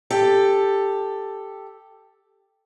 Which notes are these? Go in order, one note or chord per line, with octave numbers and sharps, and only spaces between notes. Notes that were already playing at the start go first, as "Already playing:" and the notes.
G4 A4 G5